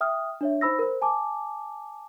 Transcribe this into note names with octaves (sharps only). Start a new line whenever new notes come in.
E5 G5 D#6 F6
D4 C#5 E5
D#4 C5 B5 E6 A#6
A#4 C5
G#5 A5 D6